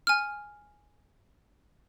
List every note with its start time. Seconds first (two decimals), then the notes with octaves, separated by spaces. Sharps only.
0.07 G#5 F6